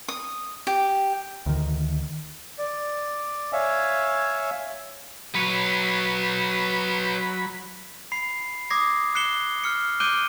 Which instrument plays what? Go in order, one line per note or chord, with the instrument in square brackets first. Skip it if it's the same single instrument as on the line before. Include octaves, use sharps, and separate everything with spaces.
[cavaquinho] D#6
G4
[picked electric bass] D2 D#3
[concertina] D5
C#5 E5 F5 G#5
[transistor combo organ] F#3 B5 [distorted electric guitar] B4 C#5
[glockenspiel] B5 C7
D6 D#6 G#6 A#6 C7
F#6 C7 C#7 E7 G7
F6 C#7
D6 F#6 G6 D7 D#7 G7